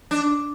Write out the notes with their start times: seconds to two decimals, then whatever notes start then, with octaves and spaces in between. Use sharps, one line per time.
0.11 D4